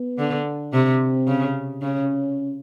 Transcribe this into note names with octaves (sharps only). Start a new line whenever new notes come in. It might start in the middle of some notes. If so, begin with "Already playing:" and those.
Already playing: B3
D3
C3 C4
C#3
C#3 C#4